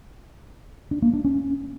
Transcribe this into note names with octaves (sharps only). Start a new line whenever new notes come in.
D4
A#3
D4
C#4